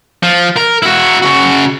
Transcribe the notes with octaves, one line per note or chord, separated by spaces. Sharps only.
F3
A#4
E4 F#4
C#3 F#4